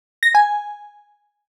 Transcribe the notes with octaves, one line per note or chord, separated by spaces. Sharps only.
A#6
G#5